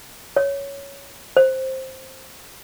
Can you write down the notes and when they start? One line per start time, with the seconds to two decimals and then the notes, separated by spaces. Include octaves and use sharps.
0.36 C#5
1.37 C5